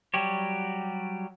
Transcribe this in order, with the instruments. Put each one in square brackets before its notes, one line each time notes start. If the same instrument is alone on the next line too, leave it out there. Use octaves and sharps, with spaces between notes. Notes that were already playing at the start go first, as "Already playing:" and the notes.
[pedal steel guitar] F#3 G3 F#4 G4 C#5